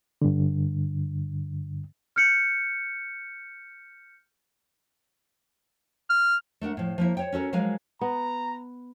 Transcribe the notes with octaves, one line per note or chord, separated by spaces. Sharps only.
G2 D3
F6 G6 C#7
F6
A3 D4 A#4 F#5
A2 F3
F3 A#3 E4
C5 C#5 G5
C#4 F#4 A4 A#4
F3 F#3 G#3 A#4 F5 G#5
B3 A#5